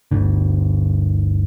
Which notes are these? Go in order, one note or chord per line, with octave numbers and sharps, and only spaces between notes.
G1 D2 D3